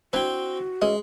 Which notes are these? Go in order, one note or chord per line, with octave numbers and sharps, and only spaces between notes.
C4 D4 E4 F#4 C5 G5
E3 G#3 C#4 D#5